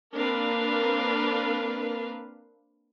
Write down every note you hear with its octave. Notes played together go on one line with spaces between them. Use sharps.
A#3 C4 D4 A#4 B4 F5